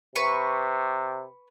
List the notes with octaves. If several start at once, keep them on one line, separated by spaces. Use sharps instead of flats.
C3 B4 C#6